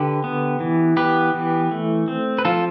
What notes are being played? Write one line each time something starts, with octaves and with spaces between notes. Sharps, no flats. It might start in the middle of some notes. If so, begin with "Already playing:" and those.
Already playing: D3 G4 B4
B3
E3
B3 G4 B4
E3
A3
C4
B4
F3 F4 A4